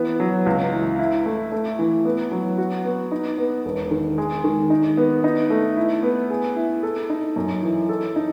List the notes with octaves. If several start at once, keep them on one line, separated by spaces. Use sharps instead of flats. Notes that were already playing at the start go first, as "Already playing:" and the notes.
Already playing: E3 B3
F#3
C#2
E3
E4
A3
A3
E3
B3
F#3
F#4
B3
D#4
B3
E1
D#3
G#3
D#3
D#4
B3
D#4
A3
E4
B3
G#4
E4
A4
D#4
F#2
E3
A4
D#4